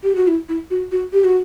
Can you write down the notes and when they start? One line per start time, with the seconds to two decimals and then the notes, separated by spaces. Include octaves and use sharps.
0.03 G4
0.16 F#4
0.28 E4
0.49 E4
0.70 F#4
0.92 F#4
1.13 G4
1.24 F#4